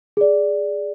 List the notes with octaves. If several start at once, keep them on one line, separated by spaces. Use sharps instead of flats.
G#4 D5